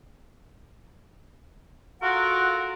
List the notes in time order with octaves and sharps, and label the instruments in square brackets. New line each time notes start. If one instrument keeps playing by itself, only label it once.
[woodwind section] F4 F#4 A4 A#4 F#5